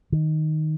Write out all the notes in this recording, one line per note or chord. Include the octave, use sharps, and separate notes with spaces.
D#3